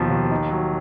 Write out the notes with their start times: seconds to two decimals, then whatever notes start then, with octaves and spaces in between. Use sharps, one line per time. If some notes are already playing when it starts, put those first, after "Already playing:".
Already playing: D#2 B2 F3
0.11 D#2
0.31 D#4
0.51 F#3